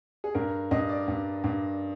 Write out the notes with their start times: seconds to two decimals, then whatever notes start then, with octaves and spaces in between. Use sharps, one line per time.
0.24 G#4
0.34 G2 A#4
0.71 G2 D#5
0.89 D5
1.08 G2
1.44 G2